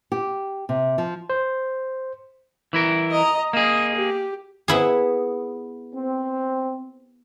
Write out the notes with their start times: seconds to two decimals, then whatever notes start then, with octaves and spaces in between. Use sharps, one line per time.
0.12 G4
0.69 C3
0.98 F3
1.30 C5
2.73 E3 E4 A#4
3.11 D#5 A#5
3.53 A#3 G#4 D#5
3.96 G4
4.68 B3 E4 G#4
5.95 C4